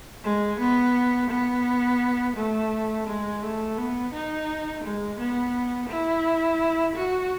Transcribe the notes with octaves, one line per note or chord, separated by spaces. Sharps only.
G#3
B3
B3
A3
G#3
A3
B3
D#4
G#3
B3
E4
F#4